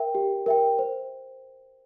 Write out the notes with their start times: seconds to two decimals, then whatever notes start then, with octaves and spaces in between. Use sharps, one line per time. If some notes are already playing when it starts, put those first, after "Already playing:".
Already playing: A#4 E5 G5
0.15 G4
0.46 A#4 E5 G5
0.79 C5